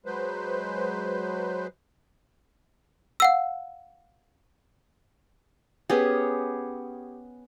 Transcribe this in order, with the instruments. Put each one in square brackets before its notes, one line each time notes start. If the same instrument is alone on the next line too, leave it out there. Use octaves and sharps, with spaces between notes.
[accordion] F#3 G#3 B4 C5
[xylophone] F5 F#5 E6
[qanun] B3 C#4 G4 G#4